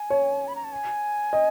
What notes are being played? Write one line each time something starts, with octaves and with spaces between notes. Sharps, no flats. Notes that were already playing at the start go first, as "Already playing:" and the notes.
Already playing: G#5
C#5
B5
A#5
A5
G#5
D#5